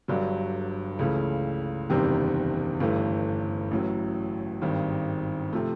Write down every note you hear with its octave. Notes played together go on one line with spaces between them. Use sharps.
G1 G2 D3 F#3
C#2 C#3 E3 A3
F#1 E2 C3 D#3 G3
G1 G2 E3 A3
A1 A2 F#3
G#1 G2 D#3
C3 F3 A3